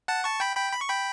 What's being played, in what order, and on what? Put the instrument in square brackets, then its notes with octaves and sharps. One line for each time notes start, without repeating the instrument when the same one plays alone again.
[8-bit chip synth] F#5 A5
A5 C#6
G5 B5
G5 B5
B5
C#6
G5 B5